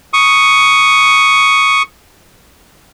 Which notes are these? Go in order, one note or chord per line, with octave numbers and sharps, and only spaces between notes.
C#6 D#6